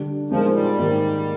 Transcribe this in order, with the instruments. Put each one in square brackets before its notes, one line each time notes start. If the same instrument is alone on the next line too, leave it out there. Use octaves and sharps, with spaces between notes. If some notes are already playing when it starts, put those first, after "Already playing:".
Already playing: [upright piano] D3 G3 D4
[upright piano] A#2 G#3 C4 D#4 A#4 [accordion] F3
[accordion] G3
[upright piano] G#2 D#3 A#3